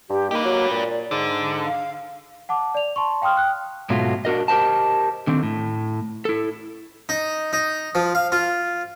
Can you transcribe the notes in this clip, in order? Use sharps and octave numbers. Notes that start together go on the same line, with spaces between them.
G2 G4
A#3 D#4 G4 B4
F#3
A#2 D5
G#2 D3
F5
F#5 A5 D6
D5 F7
A5 C6 C#6
F5 G5 C6 D#6 F6
G5 F#6
G#2 B2 F#3 A3 F4
D4 F#4 A#4 D#5
G4 A#4 C5 D#5 A5
D3 D#3 C4
A2
E4 A4
D#4
D#4
F3
F5
F4